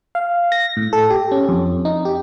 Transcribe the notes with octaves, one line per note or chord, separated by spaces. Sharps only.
F5
A#6
A2
A4
G4
C#4
F2
D#4
G4